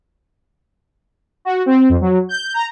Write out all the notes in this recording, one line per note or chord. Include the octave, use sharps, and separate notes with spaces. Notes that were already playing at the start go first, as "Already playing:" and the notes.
F#4
C4
F2
F#3
G6
A#5